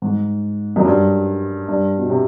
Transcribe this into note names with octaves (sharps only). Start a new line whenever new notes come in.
G#2
F#2
G2
G2
B2
C3